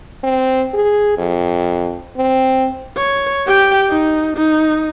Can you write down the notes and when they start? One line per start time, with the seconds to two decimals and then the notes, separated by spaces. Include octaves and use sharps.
0.24 C4
0.74 G#4
1.18 F2
2.17 C4
2.97 C#5
3.47 G4 G5
3.90 D#4
4.37 D#4